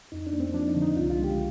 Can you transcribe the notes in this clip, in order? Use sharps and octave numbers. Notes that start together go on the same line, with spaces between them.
F2 D#4
D4
A#3
C4
F3 D4
D#4
D3
D#4
C2 F4
F4
G#3
G4